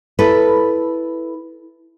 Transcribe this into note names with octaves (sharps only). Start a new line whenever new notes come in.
E4 A4 B4